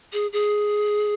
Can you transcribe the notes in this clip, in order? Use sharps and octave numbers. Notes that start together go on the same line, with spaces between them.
G#4
G#4